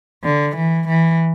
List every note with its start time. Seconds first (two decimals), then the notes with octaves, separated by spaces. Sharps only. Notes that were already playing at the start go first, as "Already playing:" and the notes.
0.24 D3
0.56 E3
0.87 E3